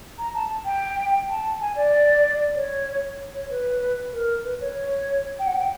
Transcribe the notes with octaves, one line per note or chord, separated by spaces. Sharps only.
A#5
A5
G5
A5
G#5
D5
C#5
C#5
B4
A#4
B4
C#5
C#5
G5
F#5
G5